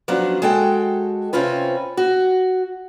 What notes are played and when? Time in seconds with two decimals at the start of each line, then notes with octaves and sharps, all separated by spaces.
0.08 F3 F#3 B3 C#4 D4
0.42 G#3 F#4 A4 G5
1.33 C3 C4 C#4 F4 B4
1.97 F#4